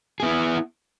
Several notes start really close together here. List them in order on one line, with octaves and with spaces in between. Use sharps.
G#4 B3 E4